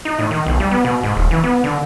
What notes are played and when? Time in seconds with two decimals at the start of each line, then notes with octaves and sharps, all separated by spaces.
0.05 D#4
0.19 A2
0.31 D#3
0.46 B1
0.60 G3
0.71 B3
0.85 B2
1.03 G#2
1.15 D#1
1.31 E3
1.44 B3
1.64 D3